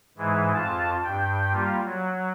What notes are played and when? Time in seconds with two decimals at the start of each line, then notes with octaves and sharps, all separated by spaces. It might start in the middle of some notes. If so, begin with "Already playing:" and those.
0.17 G#2 E3 G#3
0.54 F2 F4 A5
1.04 G2 G5
1.53 G3 A#3 F4
1.85 F#3